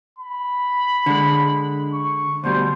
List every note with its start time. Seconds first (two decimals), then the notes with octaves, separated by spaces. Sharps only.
0.18 B5
1.06 D3 G#3
1.94 C#6
2.44 D2 B2 G3 C5